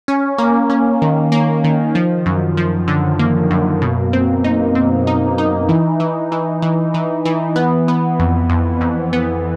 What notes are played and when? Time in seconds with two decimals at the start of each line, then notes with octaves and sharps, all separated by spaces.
0.08 C#4
0.38 A#3
0.70 C#4
1.02 D#3
1.32 A#3
1.64 D#3
1.95 F3
2.26 F#2
2.57 F3
2.88 D3
3.19 A#3
3.51 F#2
3.82 B2
4.13 C4
4.44 D#4
4.75 C4
5.07 D#4
5.38 D#4
5.69 E3
6.00 E3
6.32 E3
6.62 E3
6.94 E3
7.25 E3
7.56 B3
7.88 B3
8.19 F2
8.50 F2
8.81 F2
9.13 B3